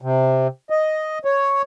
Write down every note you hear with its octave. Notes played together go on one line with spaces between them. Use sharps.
C3
D#5
C#5